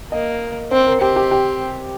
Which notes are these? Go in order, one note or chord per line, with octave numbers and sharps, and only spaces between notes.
A#3 D#5
C4 C5
A#4
C4 G4
G4
G4